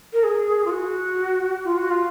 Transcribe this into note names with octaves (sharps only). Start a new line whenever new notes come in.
A#4
G#4
F4
F#4
F4
F#4
F4